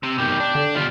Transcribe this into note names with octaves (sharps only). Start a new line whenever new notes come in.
C3 E6
B2 D#3 G4
D4
D3
B2 G3 F4